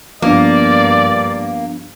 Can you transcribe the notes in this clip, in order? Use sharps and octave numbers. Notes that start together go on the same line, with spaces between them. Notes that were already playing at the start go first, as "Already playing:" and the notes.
G2 F3 A#3 B3 D4 D5